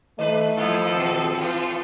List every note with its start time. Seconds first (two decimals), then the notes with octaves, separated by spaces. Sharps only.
0.19 D#3 A3 B4 D#5
0.57 F3 A#3 E4 F4 A4
0.95 D#2 B2 C4
1.38 A2 E3 A3 F4